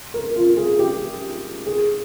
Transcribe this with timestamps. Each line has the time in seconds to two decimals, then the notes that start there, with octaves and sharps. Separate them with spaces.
0.14 A#4
0.36 F4
0.57 G#4
0.79 G4
1.67 G#4